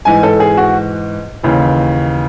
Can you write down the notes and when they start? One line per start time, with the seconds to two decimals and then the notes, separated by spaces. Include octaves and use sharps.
0.05 G#2 E3 G#5
0.23 A4
0.40 G#4
0.57 F#4
1.43 D#2 C#3 E3